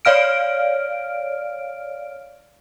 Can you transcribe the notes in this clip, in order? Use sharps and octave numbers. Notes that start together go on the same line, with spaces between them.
C#5 D5 F5 F6 D7